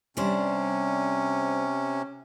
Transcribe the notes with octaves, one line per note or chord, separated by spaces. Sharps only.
C3 G3 C#4 D4 C5